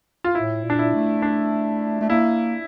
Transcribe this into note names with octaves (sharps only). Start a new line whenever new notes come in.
F4
A2 E4
A#2
D4
E4
A3
D4
A3
A#3 E4